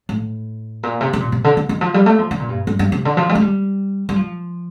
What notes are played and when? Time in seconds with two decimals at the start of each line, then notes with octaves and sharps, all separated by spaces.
0.09 A2
0.83 A#2
1.01 C3
1.13 C3
1.20 A#2
1.32 C3
1.44 D3
1.57 D3
1.69 D#3
1.81 F3
1.94 G3
2.06 A3
2.19 F3
2.31 D3
2.40 A#2
2.49 G2
2.67 G2
2.79 G2
2.92 C3
3.05 D3
3.17 F3
3.29 G3
3.35 A3
3.41 G3
4.09 G3
4.16 F3